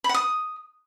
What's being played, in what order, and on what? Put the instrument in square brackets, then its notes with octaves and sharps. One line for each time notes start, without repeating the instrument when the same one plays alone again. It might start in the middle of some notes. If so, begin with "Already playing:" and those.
[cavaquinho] B5
F#5
D#6